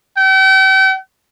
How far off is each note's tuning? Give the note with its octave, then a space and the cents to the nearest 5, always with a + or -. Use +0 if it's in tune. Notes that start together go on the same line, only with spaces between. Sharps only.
G5 -40